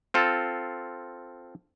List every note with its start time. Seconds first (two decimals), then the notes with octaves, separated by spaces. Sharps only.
0.14 C4 F4 A4